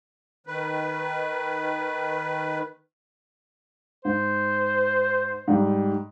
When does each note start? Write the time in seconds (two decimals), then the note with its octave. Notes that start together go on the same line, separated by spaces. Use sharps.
0.47 D#3 B4
4.05 G#2 C5
5.48 G#2 G3